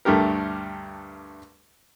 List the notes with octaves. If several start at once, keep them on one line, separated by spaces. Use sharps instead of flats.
D2 G2 A3 G4 A#4